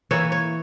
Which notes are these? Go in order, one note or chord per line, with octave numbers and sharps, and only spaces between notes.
E3 A#3 E4 C#5
C#5